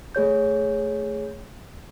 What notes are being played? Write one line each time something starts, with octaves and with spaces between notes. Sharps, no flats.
A3 G#4 C#5 G6